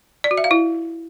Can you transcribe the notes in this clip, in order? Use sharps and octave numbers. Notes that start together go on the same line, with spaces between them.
D5
F#4
E5
F5
E4